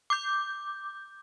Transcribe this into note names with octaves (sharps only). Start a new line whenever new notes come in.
D6 G6